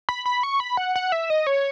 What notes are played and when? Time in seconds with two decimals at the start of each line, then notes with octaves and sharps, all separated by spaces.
0.09 B5
0.26 B5
0.43 C#6
0.60 B5
0.77 F#5
0.96 F#5
1.12 E5
1.30 D#5
1.47 C#5